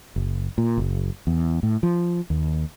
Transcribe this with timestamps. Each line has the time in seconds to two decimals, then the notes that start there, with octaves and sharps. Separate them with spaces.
0.16 F#1
0.58 A#2
0.78 F#1
1.27 E2
1.63 A2
1.83 F3
2.30 D#2